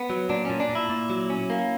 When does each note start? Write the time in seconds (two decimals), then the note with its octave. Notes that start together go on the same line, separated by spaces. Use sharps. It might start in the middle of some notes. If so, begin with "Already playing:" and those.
Already playing: B3
0.10 F#3
0.29 A#2 D4
0.45 A#2 C#4
0.60 D4
0.70 A#2
0.75 E4
0.89 A#2
1.10 F#3
1.30 C#4
1.50 A#3